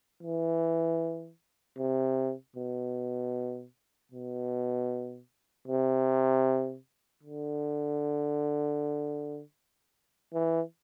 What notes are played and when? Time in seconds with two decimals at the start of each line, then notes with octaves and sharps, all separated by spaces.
0.23 E3
1.79 C3
2.56 B2
4.12 B2
5.68 C3
7.23 D3
10.34 E3